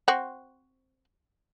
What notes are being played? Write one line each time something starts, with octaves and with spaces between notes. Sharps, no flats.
C4 F#4